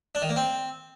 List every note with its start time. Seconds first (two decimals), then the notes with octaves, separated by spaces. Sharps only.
0.15 D4
0.22 D#3
0.29 A#3
0.36 C4